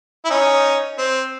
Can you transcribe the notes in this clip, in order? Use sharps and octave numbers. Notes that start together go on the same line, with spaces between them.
E4
C#4 D#4
C4